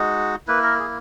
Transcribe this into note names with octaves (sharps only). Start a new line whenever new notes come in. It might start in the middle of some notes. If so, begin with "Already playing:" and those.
Already playing: G#3 D#4 F#4
A#3 E4 B4
A#4
G#4